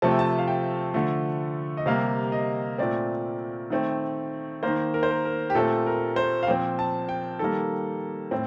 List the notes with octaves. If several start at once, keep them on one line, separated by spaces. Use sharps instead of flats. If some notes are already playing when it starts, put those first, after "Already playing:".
C3 F3 A3 C4 A5
G5
A5
F5
G5
D3 F3 A3
D#5
C3 G3 A#3 F5
D#5
A#2 A3 C4 D5
D#3 A3 C4
D#3 A#3 C5
A#4
C5
A#4
A#4
G4
A#2 A3 C4 A4
A#4
C5
F5
A#2 F3 C4 G5
A5
G5
D#3 G3 A#3 A4
A2 C4